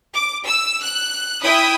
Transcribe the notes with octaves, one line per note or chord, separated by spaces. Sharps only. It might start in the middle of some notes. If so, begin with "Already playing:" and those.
D6
E6
F#6
E4 G5 B5 D#6